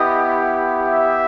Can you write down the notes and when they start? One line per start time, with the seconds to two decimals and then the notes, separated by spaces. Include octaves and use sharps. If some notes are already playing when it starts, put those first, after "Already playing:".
Already playing: B3 E4 G4 D#5
0.88 E5